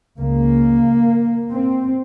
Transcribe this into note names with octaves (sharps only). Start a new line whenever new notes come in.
C#2 C#3 A#3
C4